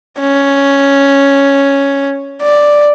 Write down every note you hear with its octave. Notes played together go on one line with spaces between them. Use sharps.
C#4
D5